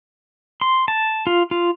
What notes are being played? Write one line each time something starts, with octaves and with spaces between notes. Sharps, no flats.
C6
A5
F4
F4